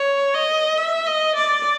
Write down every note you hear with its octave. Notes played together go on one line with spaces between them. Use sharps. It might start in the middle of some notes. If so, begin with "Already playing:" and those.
Already playing: C#5
D#5
E5
D#5
D5